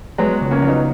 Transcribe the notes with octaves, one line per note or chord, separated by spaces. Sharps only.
F#3 G#3 B3
C#2
A#3 C#4
F#3
B3 D#4